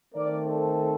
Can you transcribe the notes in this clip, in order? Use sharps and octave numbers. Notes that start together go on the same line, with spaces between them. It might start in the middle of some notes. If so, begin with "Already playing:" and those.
D#3 A3 C4 A#4 D5
A4 C5